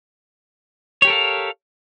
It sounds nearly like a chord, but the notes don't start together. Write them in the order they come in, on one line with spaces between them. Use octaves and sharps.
C#5 G4 A#4 A4 F5